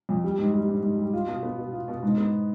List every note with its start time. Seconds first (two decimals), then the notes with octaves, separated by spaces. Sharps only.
0.09 F2
0.24 G3
0.38 G#2
0.54 G3
0.68 G#2
0.83 G#2
0.98 G3
1.14 F4
1.27 B2
1.43 B3
1.58 B2
1.73 F4
1.88 B2
2.03 G#2
2.18 B3